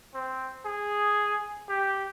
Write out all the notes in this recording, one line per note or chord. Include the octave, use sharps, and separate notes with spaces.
C4
G#4
G4